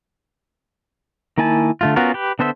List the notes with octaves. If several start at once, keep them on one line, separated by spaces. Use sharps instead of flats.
D#3 A#3 E4 G#5 A5
D3 A3 F4
B3 C#4 F4 F#4 A#4
G4 B4
D3 B3 A4 C5 E5